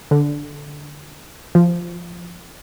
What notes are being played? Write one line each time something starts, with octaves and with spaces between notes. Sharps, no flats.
D3
F3